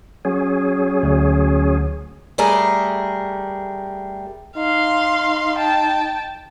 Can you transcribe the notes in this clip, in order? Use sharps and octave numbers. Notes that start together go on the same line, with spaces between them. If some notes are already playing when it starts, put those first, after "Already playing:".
F#3 C#4 G#4
D2
G3 A3 G#4 A#4
D#4 F5 C6
G5 A5